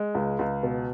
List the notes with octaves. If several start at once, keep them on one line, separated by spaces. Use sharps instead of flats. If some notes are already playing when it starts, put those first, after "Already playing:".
Already playing: G#3
C#2
C#2
B2